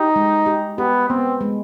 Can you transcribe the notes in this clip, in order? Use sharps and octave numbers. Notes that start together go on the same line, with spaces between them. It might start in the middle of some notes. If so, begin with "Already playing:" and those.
Already playing: D#4 G4
G#3
G4
B3 G4
B3 C4
G#3